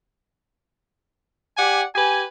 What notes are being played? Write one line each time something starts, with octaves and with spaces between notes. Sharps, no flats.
G4 D5 F#5 G#5
G4 B4 G#5